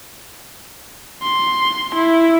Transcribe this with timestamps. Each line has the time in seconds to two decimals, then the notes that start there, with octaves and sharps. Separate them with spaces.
1.22 C6
1.95 E4